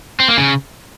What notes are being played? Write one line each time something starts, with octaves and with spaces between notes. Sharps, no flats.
C4
A#3
C#3